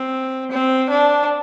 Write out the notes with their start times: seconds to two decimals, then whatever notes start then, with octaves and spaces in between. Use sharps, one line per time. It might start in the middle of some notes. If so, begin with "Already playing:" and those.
Already playing: C4
0.51 C4
0.90 D4